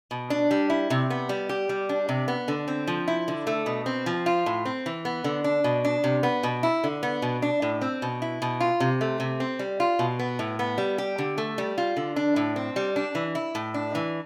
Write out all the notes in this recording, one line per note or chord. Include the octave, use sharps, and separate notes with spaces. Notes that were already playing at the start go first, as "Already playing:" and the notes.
B2
D4
G3
E4
C3
B3
G3
G4
G3
D4
C3
B3
D3
C4
F3
E4
D3
A3
B2
C4
F3
F4
A2
C4
E3
B3
D3
D4
B2
D4
C3
B3
B2
E4
D3
B3
B2
D4
A2
C4
B2
E4
B2
F4
C3
A3
C3
C4
G3
F4
B2
B3
A2
B3
G3
G4
D3
A3
G3
F4
D3
D4
A2
C4
G3
D4
E3
E4
A2
D4
E3